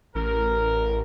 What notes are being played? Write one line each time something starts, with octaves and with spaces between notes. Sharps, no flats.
A1 A#4